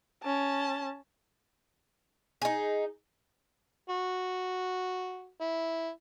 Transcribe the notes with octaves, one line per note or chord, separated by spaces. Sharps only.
C#4 A5
D#4 G#4
F#4
E4